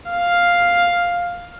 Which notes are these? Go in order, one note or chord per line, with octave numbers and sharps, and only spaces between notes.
F5